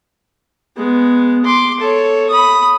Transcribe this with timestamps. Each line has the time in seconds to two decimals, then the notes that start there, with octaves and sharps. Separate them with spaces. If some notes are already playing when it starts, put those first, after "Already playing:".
0.77 G#3 B3
1.45 C6 D6
1.80 A4 C#5
2.30 B5 D#6